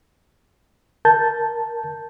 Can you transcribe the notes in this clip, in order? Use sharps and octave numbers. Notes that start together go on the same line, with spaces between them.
A#4 A5 G6 A6